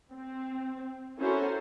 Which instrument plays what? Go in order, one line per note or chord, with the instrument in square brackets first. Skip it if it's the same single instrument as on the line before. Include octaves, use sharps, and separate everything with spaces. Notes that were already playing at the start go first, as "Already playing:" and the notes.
[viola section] C4
C#4 E4 F#4 A4 A#4 C5